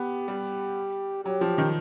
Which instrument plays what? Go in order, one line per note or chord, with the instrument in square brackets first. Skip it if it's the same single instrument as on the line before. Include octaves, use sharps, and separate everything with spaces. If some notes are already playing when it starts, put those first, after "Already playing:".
Already playing: [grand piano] B3 [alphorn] G4
[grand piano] G3
[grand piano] F#3 [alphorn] G4
[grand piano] F3
D#3